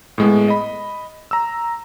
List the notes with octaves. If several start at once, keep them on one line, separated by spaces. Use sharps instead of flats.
A2 G#3 B3
D#5 B5
A#5 E6